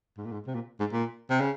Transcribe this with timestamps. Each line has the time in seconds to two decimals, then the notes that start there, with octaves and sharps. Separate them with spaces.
0.18 G#2
0.25 A#2
0.32 G#2
0.47 C3
0.55 A#2
0.80 G#2
0.92 A#2
1.30 C3
1.41 C#3